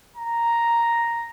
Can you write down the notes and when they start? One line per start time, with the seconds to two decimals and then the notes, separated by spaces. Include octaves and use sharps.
0.16 A#5